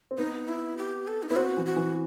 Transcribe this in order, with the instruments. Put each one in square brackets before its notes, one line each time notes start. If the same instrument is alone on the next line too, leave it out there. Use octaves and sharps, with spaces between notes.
[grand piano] C4
[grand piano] B3 [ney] D#4
[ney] E4
G4
A4
D#4
[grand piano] B3 [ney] E4
[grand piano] C4 [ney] F#4
[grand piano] E3
[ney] F#4
[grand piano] E3